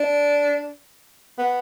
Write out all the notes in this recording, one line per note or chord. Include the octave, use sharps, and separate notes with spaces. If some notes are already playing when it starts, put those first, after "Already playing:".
Already playing: D4
B3